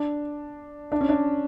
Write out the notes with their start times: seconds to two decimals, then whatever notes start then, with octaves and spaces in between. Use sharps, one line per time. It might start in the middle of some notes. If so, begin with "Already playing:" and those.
Already playing: D4
0.92 D4
1.01 C#4
1.09 D4